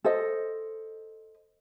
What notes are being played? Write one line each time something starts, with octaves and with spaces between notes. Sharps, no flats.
A4 C5 D#5